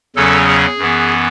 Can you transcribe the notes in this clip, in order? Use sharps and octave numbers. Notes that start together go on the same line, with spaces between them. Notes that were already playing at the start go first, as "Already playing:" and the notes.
E2 C#3 F#3 C#4 A4
G#4
F#2 E3 B3